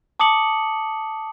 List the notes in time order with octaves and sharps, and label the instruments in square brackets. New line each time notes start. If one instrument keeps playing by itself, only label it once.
[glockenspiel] A5 D6 D#6 C#7 F#7